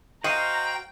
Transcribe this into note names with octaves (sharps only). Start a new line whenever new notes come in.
F#4 C5 D#5 F5 G5 A#5